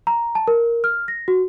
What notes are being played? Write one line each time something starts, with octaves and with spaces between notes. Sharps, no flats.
A#5
A5
A#4
F6
A#6
F#4